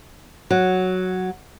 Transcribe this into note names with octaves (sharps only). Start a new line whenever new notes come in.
F#3